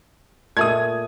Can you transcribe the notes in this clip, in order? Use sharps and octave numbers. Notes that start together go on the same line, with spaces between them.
A#2 A3 D#6 G#6